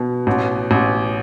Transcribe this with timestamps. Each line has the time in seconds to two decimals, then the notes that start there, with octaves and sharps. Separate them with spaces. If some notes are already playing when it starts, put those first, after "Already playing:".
Already playing: B2
0.27 A1
0.71 A1